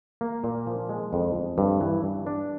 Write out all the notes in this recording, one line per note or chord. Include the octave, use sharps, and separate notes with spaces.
A#3
A#2
F3
G#3
F2
F2
G2
E3
G2
D4